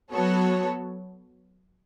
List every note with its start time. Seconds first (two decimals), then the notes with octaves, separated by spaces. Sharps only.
0.11 F#3 B3 F#4 A4 C#5